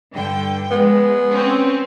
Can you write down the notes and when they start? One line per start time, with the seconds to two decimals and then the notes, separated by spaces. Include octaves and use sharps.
0.15 G2 D3 G5
0.71 F3 G#3 B3
1.32 C4 C#4